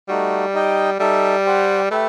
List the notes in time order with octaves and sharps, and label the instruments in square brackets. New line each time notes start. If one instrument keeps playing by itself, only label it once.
[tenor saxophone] G3 [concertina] A3 D#4 F#4
[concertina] D#4 G4 D#5 G5
[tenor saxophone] G3 [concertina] D#4 A4 E5
[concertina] G4 C5 F#5
[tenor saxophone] A3 [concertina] G4 B4 E5